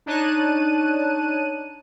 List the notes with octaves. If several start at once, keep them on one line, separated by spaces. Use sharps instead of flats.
D4 D#4 C#5 A5 F#6 D#7